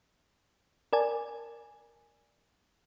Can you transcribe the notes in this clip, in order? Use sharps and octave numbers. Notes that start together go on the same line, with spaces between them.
A#4 D5 G#5 A5